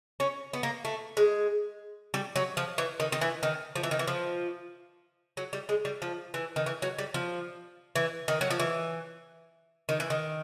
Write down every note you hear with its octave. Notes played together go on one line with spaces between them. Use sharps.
C#4
B3
A#3
A3
G#3
G3
F#3
F3
E3
D#3
D#3
E3
D#3
F3
E3
D#3
E3
F3
F#3
G3
G#3
G3
F3
E3
D#3
E3
F#3
G3
F3
E3
D#3
F#3
F3
E3
D#3
E3
D#3